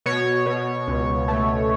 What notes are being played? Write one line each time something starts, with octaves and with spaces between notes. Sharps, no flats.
B2 C#5
B2
C#2
A3